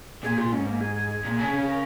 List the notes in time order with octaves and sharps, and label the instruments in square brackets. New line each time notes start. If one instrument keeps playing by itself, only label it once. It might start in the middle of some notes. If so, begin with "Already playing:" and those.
[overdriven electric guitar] A#2 [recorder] G#4
[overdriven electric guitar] A#2 [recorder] F4
[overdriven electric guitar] G#2 [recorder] C#4
[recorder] A#3
G#4
G#4
G#4
[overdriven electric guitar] A#2
C#3
C#3
[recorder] A#4